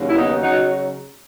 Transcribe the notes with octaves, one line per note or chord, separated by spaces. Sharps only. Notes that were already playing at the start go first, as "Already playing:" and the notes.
Already playing: D#2 C#3 F#3
E4
B3 D#4
C#3 F#3 D#4 F#4